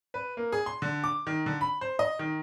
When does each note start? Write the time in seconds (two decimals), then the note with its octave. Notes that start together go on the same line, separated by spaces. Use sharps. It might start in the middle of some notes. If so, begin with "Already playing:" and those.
0.14 B4
0.37 A#3
0.52 G#4
0.66 C6
0.82 D3
1.04 D6
1.27 D#3
1.46 D3
1.61 B5
1.81 C5
1.99 D#5
2.19 D#3